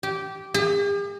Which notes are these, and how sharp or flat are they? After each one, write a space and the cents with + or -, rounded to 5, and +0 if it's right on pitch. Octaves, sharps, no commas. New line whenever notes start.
G4 -15
G4 +45